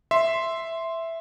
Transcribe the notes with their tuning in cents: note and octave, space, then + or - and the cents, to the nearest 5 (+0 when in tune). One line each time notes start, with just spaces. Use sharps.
E5 +0 C6 +0